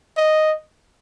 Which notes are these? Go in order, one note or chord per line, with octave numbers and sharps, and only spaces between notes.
D#5